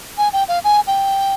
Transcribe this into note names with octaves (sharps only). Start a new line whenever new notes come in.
G#5
G5
F5
G#5
G5